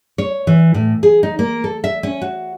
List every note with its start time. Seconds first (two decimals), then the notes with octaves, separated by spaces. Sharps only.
0.18 C#5
0.47 E3
0.74 A2
1.03 G#4
1.23 D#4
1.39 A#3
1.64 A4
1.84 E5
2.03 C#4
2.21 F#4